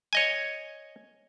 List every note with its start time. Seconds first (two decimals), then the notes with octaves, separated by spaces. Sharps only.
0.13 C#5 D#5 G#5